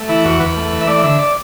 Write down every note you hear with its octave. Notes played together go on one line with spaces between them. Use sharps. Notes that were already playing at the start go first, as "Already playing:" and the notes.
Already playing: A3
E3 E4
E2 F#4
E2 B4
A3
E3
E5
A3 D5
D3 E5
D5